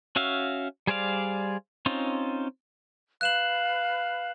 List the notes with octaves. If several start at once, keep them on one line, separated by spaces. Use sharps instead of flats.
C#4 F#4 E5 F5
G3 G#4 C5 D5 F5
C4 C#4 D#4 F4
B4 F5 F#6 E7 F#7